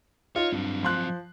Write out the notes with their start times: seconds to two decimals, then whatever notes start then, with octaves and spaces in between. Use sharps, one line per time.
0.36 D#4 F4 C#5
0.52 G2 F#3 C4
0.83 F3 C6 F#6